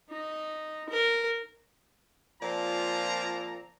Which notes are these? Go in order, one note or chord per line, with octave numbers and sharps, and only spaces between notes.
D#4
A#4
A#2 F3 C4 D5 A5 A#5